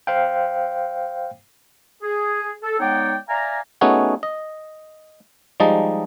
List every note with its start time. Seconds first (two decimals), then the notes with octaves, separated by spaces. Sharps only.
0.07 C5 F5 G5
2.02 G#4
2.63 A4
2.80 G#3 B3 D#4 C#5 D5 G5
3.29 D5 E5 F5 G#5 A#5
3.81 A3 B3 C#4 D#4 F#4 G#4
4.23 D#5
5.60 F3 G3 G#3 D#4 D#5 A5